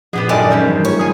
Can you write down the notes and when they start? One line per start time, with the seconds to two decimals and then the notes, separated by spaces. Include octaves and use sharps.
0.13 A#2 F3 B3 D4 G4 G#4 D#5 F#5
0.29 G#1 F#2 G3 G#3 A4 D5
0.51 B2 C#4 C5
0.66 G#2 E3 G3
0.85 A3 F4 G#4 C#5
0.99 G1 G#4 G#5 D#6 G#6